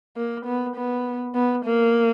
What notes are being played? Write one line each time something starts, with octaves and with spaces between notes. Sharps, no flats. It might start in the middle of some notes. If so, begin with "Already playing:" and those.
A#3
B3
B3
B3
A#3